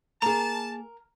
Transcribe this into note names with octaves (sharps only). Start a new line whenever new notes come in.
A#3 G#4 A#4 A5 A#5